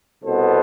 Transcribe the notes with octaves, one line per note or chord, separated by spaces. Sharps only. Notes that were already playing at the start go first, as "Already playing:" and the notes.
C2 B2 B3 A4 C5